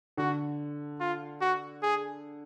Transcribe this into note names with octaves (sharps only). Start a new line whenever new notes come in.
D3 F#4
F4
F#4
G#4